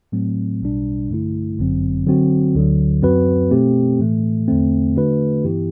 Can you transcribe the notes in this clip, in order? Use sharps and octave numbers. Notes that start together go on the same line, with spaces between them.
A2 F#3 A3 C4
B1 B2 G3 D4
G2 D3 A3 E4
G1 F#2 D3 F#3 C4
D3 F#3 C4 F#4
D2 D3 F#3
F#2 F#3 C4 F#4 B4
B2 A3 C4 G4
A2 E3 A3
E2 D3 A3 C4
D3 A3 D4 F#4 B4
G2 E3 B3 E4 G4